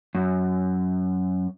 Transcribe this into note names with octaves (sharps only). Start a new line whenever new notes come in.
F#2